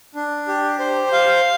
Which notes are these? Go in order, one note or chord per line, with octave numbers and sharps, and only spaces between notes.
D4
G4
C5
F5